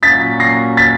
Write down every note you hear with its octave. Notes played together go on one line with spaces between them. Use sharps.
A#2 F#3 A#3 C#4 F#4 A6 B6
A#6 C7
A6 B6